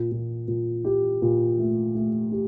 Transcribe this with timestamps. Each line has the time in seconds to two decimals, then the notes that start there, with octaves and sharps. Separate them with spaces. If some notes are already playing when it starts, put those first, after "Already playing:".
Already playing: A#2
0.11 A#2
0.48 A#2
0.85 G4
1.22 A#2
1.59 A3
1.95 A3
2.32 G4